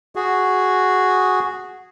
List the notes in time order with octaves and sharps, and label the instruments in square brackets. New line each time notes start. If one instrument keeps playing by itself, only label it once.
[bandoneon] F#4 G#4